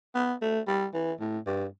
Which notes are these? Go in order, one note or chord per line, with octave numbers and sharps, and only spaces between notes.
B3
A3
G3
E3
A2
G2